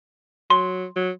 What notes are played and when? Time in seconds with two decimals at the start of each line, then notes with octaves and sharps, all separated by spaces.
0.50 F#3 C6
0.96 F#3